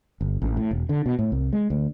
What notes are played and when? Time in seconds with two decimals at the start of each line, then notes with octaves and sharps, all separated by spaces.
0.21 G1
0.42 A1
0.57 A2
0.71 E1
0.89 D3
1.06 B2
1.19 A2
1.32 C2
1.53 G#3
1.70 D2